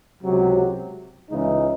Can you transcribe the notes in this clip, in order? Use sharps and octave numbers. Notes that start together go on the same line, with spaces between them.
C#2 C3 F#3
C#2 C#3 E3 G#3 D#4